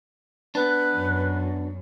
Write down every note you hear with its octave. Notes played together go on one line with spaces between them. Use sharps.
B3 D4 B4
F#2